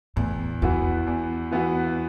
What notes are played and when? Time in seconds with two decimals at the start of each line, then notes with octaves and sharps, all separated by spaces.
0.16 E2 A2
0.62 E2 E3 B3 F#4
1.07 E2
1.51 E3 B3 F#4